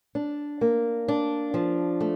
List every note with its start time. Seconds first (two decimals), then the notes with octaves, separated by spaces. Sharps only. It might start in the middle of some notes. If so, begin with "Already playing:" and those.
0.15 D4
0.61 A#3
1.08 D4
1.54 F3
2.01 A3